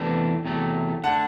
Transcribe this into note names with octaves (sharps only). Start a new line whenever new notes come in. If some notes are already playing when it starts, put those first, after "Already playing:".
Already playing: E2 C3 E3 A3 D4
E2 C3 F#3 A3
D3 A3 D4 F#5 A5